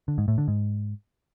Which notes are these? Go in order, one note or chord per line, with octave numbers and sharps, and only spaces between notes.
D3
G#2
A2
D3
G#2